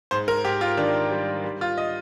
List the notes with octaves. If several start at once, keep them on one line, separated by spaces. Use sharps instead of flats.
G#2 C5
A#4
G#2 G4
F4
D#3 D4
G3
G3
F4
D#5